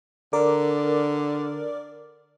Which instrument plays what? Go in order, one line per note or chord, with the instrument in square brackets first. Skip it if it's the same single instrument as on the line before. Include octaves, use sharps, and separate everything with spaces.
[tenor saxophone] D3 [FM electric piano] A#4 D5 D6